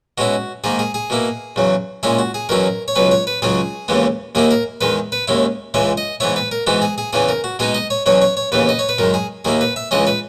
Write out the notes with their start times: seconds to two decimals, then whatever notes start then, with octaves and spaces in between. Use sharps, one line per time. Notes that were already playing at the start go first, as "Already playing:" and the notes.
0.18 B2 G#3 C#4 E4 F#4
0.64 G#2 D#3 A#3 G#4
0.79 G#4
0.94 G#4
1.10 B2 A#3 E4
1.56 E2 C#3 F#3
2.03 A#2 G#3 C#4 E4 G#4
2.19 F#4
2.34 G#4
2.49 E2 B2 F#3 C#4 E4 A#4
2.88 C#5
2.95 C#2 B2 F#3 C#4 B4
3.11 C#5
3.27 B4
3.42 C#2 C#3 F#3 C#4 G#4
3.88 D#2 C#3 E3 G#3 B3
4.35 D#2 D#3 A#3 E4 G#4
4.51 A#4
4.81 E2 D#3 G#3 B4
5.12 B4
5.28 D#2 D#3 G#3 C#4 E4
5.74 C#2 C#3 E3 G#3 C#4 E5
5.97 D#5
6.20 G#2 E3 B3 E4 C#5
6.36 B4
6.51 A#4
6.67 G#2 E3 G#3 B3 E4 F#4
6.82 G#4
6.98 G#4
7.13 E2 C#3 E3 B3 G#4
7.29 A#4
7.44 F#4
7.59 B2 G#3 B3 D#4 G#4
7.74 D#5
7.90 C#5
8.06 E2 B2 F#3 C#4 C#5
8.22 C#5
8.37 C#5
8.52 D#2 C#3 E3 B3 B4
8.69 D#5
8.79 C#5
8.89 B4
8.98 F#2 D#3 G#3 A#4
9.14 G#4
9.45 D#2 D#3 A#3 E4 G#4
9.61 B4
9.76 E5
9.91 C#2 C#3 E3 G#3 C#4 D#5
10.07 B4